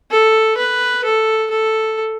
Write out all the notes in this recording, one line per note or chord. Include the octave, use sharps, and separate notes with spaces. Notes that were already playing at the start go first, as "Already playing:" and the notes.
A4
B4
A4
A4